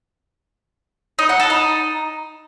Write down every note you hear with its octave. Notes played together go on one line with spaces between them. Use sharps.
D#4
F#5
A4
D#4